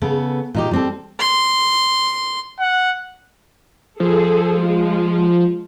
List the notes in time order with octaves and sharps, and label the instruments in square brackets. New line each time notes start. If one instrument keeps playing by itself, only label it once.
[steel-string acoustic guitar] C#3 B3 A4
A#2 D#4 G4
G3 C4 A4
[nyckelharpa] C6
[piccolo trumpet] F#5
[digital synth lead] F3 [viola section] G#4 A4
[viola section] G#3 F4